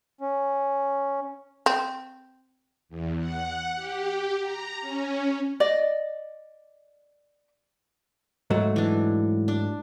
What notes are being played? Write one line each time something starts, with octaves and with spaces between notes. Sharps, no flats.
C#4
C4
E2
F#5
G4
A#5
C#4
D5 D#5
G#2 F#3 A3
E3 D4
D4